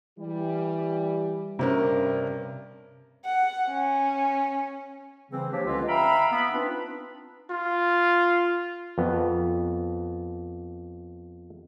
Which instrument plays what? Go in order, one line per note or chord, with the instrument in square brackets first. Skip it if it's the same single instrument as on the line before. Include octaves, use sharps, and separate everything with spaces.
[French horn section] E3 G3
[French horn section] G2 [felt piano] C3 C#4 A#4
[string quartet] F#5
C#4
[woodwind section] C#3 E3 G3 C4
F3 A#3 C4 D4 G4 C#5
C#2 D3 C#4 F4 B4 D#5
E5 F5 G5 A#5 B5
B3 B5
C4 D4 D#4 F4 B4
[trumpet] F4
[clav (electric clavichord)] F2 B3